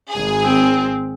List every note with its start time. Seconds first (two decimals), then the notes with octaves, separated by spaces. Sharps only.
0.11 G#1 G#4
0.43 C4